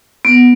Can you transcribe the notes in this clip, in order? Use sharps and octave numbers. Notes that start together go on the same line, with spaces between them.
B3